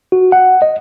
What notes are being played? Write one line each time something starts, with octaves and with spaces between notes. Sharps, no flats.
F#4
F#5
D#5